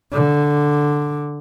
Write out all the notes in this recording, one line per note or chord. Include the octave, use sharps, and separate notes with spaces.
D3